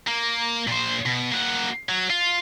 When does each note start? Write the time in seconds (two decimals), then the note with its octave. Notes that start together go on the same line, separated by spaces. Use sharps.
0.08 A#3
0.67 A#2 C5
1.06 B2
1.32 A#3 F#4
1.89 F#3
2.10 F4